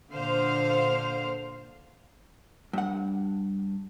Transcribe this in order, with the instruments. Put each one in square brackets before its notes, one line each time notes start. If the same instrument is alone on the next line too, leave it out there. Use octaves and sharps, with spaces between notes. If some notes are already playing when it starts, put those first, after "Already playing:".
[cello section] A#2 D3 C5 F5
[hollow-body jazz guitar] G2 F#5